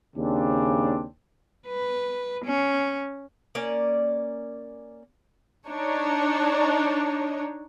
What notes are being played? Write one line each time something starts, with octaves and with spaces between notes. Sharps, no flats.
D#2 C#3 C4 D4
B4
C#4
A#3 C#4 D5
D4 D#4 C#5